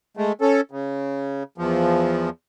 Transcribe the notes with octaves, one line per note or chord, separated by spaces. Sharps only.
G#3 A3
C#4 A4
C#3
E2 F3